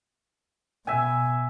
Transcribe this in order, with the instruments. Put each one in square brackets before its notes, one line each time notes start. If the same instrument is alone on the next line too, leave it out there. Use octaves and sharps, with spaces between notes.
[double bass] B2 [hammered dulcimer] E5 G#5